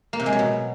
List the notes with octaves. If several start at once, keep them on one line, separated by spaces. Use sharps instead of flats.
A#3
C3
G#3
F#3
B2